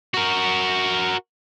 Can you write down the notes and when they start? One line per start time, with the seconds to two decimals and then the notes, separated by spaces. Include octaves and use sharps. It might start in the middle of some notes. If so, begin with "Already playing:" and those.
0.14 F#4 A#4